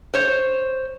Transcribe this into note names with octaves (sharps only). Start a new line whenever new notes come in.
C5 C#5